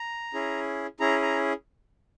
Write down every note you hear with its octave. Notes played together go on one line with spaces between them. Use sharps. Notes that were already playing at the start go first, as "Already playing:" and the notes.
Already playing: A#5
C#4 E4 G#4
C#4 E4 G#4 A#5
A#5